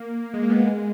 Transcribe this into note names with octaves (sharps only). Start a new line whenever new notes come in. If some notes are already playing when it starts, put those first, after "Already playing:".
Already playing: A#3
G#3
A#3
B3
G#3